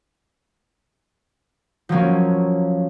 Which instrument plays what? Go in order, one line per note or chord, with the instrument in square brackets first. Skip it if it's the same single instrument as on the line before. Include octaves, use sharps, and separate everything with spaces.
[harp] F3 F#3 A#3 C#4